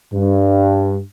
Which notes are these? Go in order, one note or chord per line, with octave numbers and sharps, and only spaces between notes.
G2